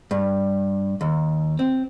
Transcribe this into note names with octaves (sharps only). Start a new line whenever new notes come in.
G2
D#2
C4